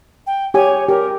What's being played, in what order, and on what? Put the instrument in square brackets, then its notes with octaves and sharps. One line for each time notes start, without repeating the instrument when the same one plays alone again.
[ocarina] G5
[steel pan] G4 G#5 [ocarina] C#5
[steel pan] G4 [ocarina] A#4